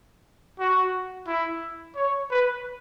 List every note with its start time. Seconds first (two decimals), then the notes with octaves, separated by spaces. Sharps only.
0.60 F#4
1.28 E4
1.96 C#5
2.31 B4